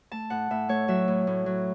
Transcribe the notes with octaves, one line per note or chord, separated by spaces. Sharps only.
A3 A5
A2 F#5
A2 E5
A3 C#5
F#3 E5
A2
A2
F#3